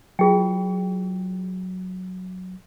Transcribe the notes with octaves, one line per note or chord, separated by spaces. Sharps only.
F#3 F4 G#4 G5